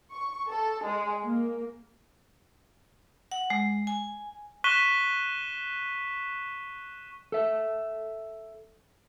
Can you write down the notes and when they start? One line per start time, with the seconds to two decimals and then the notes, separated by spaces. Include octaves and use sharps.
0.12 C#6
0.51 A4
0.85 G#3
1.23 A#3
3.31 F#5
3.50 G#3
3.87 G#5
4.64 C#6 F#6 B6 D#7 E7 G7
7.32 A4 E5